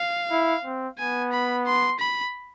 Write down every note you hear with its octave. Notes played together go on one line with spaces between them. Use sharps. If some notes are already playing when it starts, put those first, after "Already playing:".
Already playing: F5
E4
C4
B3 G#5
B5
C6
B5